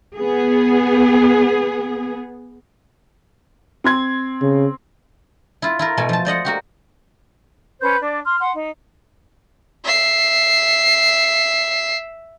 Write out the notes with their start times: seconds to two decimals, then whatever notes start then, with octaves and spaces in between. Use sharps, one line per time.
0.16 B3 G#4
3.84 C4 C6 G#6
4.42 C#3
5.62 E4 F4
5.79 E4 F4 A#4
5.97 B2 A3 G#5
6.09 F3 A5
6.25 C5 D5 D#5 F#5
6.45 A#3 F#4 G4
7.81 C#4 B4 C5 G6
8.02 D4 D5
8.25 C6 F6
8.40 F#5 C6
8.54 D#4
9.84 E5 C7